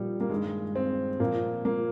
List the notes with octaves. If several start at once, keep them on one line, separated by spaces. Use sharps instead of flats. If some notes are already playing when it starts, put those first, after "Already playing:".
Already playing: A#2 F3 G3 D#4
A#3
G2 D#3 G#3
C4
A#2 F3 A#3
A#3